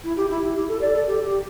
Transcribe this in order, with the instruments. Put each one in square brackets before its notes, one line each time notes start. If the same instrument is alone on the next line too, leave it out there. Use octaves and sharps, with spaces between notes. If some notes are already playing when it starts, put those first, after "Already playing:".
[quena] E4
G4
E4
E4
G4
A4
D5
A4
G4
G4